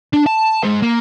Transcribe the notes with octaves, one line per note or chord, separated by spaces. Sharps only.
D4
A5
G#2 C5
A#3